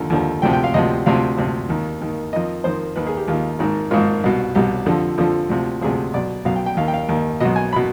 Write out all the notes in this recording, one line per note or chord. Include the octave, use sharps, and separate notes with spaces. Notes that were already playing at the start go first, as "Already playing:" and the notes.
Already playing: D#2 D3 F3
D#2 D3 F3
D2 C3 F3 G5
G5
F5
D2 C3 F3 D#5
D2 C3 F3 F5
D2 C3 F3
D#2 D#3
D#2 D#3
F2 D#3 D#5
F2 D#3 C5
D#2 D#3 B4
G#4
G4
D#2 D#3 F4
G#1 G#2 D#3
G#1 G#2 D#3 F4
C2 B2
C2 B2 G4
F2 D3 F3
F2 D3 F3
D2 C3 F3
D2 C3 F3 G#4
B1 B2 D5
B1 B2 F5
G5
G5
D#2 D#3 F5
G5
F5
D#2 D#3
B1 B2 D#5
G#5
B2 B5